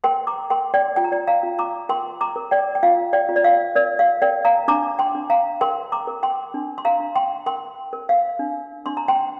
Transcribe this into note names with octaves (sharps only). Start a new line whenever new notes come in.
A#4 G5 C6
A#5 D6
A#4 G5 C6
D5 G5
F4 G5
A#5
D5 G5
F5 A#5
F4
A#5 D6
A#4 G5 C6
A#5 D6
A#4
D5 G5
G5
F4 F5
D5 G5
F4
D5
F5
A#4 D5
F5
A#4 D5 G5
F5 A#5
D4 A#5 D6
G5 C6
D4
F5 A#5
A#4 G5 C6
A#5 D6
A#4
G5 C6
D4
C6
F5 A#5
D4
G5 C6
A#4 G5 C6
A#4
F5
D4
D4 C6
A#5
G5 C6